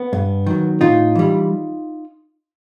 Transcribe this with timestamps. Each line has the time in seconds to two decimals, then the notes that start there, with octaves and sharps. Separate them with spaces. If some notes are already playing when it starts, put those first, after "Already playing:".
Already playing: B3
0.13 G2
0.46 D#3 F#3
0.81 A2 D#4 F4
1.15 E3 G3